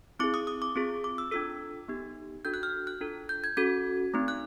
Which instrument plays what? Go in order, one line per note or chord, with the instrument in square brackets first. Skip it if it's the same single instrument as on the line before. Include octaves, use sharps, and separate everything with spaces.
[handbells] C4 E4 G#4 D6
D#6
D#6
D6
C4 F4 G#4
D6
E6
D4 F4 A4 E6
B3 D#4 G4
D4 F#4 A4 G6
F#6
F6
F#6
D4 F4 A4
G6
G#6
C#4 F#4 A4 G#6
A3 C4 D#4
F#6